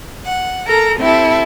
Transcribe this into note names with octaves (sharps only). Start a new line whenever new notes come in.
F#5
A4 A#4 A#5
C4 E4 G4 A4